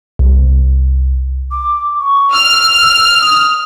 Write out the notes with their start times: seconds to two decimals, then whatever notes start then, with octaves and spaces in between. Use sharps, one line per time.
0.19 C2
1.51 D6
1.99 C#6
2.33 E6 F6
3.21 D#6